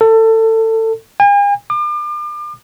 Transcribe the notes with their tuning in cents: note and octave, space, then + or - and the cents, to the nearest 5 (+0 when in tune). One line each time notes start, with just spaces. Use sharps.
A4 +25
G#5 -45
D6 +40